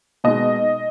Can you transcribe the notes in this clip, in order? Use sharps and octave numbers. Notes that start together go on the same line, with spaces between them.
B2 G#3 D#4 D#5